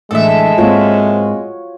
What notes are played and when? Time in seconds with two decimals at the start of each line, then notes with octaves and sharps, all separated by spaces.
0.11 A2 D3 E3 G#3 A4 E5
0.58 G#2 A#3 C4 F4 F#4 C#5